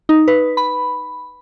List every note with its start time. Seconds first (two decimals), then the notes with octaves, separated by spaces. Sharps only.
0.09 D#4
0.28 B4
0.57 B5